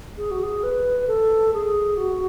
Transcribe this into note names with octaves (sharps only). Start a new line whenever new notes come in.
G#4
F#4
G#4
B4
A4
G#4
F#4